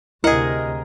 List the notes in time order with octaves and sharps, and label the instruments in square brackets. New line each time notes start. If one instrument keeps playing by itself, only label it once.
[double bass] D2 C3 [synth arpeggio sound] E4 [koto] G#4 F#5 [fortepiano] A#4 D#5